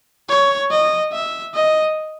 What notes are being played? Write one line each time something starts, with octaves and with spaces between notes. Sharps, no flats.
C#5
D#5
E5
D#5